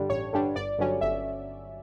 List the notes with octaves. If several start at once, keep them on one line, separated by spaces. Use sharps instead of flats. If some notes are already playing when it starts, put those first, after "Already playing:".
Already playing: G2 D3 G3 D4
A1 C#5
G2 D3 G3 D4
G1 D5
G2 D3 F#3 C#4
G1 E5